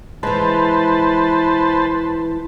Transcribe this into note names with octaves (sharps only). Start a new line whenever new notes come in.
E3 G#3 B4 C5 A5